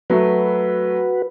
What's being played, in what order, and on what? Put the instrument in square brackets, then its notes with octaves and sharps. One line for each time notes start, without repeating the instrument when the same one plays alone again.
[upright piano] F#3 A3 [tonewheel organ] F#4 B4